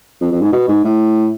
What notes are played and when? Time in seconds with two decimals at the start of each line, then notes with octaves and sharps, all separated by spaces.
0.21 F2
0.32 F2
0.41 G#2
0.53 B2
0.68 G#2
0.84 A2